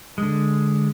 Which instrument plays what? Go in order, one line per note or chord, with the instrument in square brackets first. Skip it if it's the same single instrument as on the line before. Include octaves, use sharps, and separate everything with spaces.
[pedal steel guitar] D3 G#3